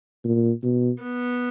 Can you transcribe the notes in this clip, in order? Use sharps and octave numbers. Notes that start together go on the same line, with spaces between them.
A#2
B2
B3